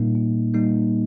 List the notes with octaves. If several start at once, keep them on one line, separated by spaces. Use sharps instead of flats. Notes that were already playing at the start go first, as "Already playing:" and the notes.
Already playing: A#2 G3 A#3 D#4
A#2
G3 A#3 D#4